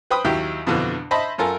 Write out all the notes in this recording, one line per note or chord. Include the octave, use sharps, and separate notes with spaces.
B4 C5 G5 B5 D#6
D#2 F#3 E4 G4
F2 B2 D3 E3
C5 D#5 E5 A5 B5
F#2 F4 A4 A#4 G#5